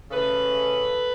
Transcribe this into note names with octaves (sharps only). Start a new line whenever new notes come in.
C#3 E3 A3 C#4 A4 B4